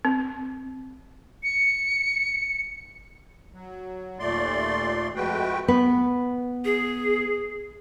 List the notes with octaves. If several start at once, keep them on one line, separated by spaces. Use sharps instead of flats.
C4
C#7
F#3
D#2 A#2 A3 D5 C6
F2 G#3 A3 F#4 B4 G5
B3 B4
G#4